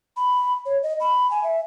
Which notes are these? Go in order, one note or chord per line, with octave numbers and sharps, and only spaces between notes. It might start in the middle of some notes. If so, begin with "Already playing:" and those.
B5
C#5
D#5
B5
G#5
E5